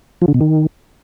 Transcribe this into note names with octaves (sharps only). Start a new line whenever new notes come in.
F3
D3
B2
D#3